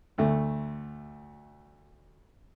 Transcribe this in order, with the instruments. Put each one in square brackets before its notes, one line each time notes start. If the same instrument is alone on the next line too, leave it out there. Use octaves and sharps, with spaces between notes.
[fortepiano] D2 A3